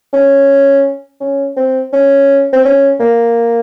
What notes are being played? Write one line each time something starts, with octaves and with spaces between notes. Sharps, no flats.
C#4
C#4
C4
C#4
C4
C#4
A#3